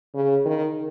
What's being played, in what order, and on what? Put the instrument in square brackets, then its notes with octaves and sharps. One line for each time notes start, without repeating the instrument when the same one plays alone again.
[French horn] C#3
D#3